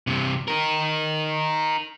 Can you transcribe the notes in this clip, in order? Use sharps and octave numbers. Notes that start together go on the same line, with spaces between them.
G2 C3
D#4 A#4